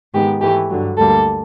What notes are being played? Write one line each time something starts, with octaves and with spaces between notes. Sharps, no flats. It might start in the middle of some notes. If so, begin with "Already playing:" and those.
G#2 D#3 G#3 B3 G4
G#2 E3 A3 G4
G2 D3 F#3
D2 D3 G3 A#3 A4